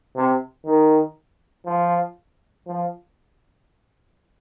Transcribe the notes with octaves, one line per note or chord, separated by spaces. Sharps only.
C3
D#3
F3
F3